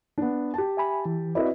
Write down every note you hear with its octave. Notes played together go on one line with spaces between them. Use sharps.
B3 D4
G4 A5
E5 G#5 B5
E3
C4 E4 F#4 B4 D5 D#5